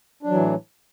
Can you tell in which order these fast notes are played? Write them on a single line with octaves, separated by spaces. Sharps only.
D4 F#3 E3 A2